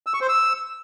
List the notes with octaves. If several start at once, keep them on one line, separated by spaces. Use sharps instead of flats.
E6
C#6
C5
E6